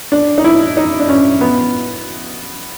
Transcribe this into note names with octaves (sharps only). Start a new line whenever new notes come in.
D4
D#4
E4
D#4
D4
C#4
B3